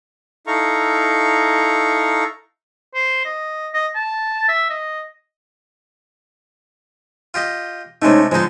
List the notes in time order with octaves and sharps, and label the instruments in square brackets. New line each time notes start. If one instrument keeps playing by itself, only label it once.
[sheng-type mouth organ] D#4 E4 A4 F5 A#5 C#6
[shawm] C5
D#5
D#5
A5
E5
D#5
[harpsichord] F4 G4 D#5
[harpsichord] C3 G#3 A3 [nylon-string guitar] C#4 D#4
[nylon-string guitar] D3 F3 [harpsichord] G#3 D#4